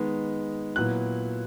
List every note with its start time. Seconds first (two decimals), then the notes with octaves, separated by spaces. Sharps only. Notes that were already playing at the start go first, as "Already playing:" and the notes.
Already playing: D#3 G#3 B3 D#4
0.76 A#2 F#3 B3 E4 F#6